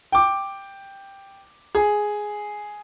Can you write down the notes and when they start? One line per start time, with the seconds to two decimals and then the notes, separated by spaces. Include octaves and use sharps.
0.12 G5 D6
1.75 G#4